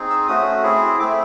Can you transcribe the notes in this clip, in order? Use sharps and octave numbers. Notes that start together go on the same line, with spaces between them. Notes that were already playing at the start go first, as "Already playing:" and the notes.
Already playing: C4 D#4 G#4
E6
A3 C#4 F#4 D#6
C4 E4 G#4
A3 C4 E4 D6